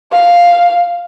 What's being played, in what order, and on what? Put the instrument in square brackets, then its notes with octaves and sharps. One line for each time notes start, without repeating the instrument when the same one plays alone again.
[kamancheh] F5